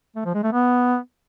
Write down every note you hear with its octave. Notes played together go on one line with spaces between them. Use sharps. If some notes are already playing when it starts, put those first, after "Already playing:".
A3
F3
G#3
A3
B3